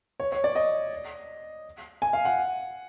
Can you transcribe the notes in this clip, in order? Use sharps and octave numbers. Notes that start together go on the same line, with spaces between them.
C#5
C#5
D5
D#5
G#5
F5
F#5